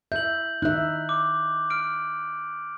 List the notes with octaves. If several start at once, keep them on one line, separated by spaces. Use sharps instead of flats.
E5 G6 F#7
D#4 E5 F#6
D6
F6 D7